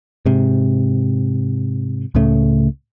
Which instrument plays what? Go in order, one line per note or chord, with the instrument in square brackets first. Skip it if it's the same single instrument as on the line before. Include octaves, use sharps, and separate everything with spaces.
[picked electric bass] G#2 C3
C#2 A2 C#3 A3